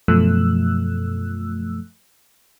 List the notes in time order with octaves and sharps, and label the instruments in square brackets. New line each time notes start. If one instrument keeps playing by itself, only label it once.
[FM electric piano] F#2 B2 F3 A3 E6 F#6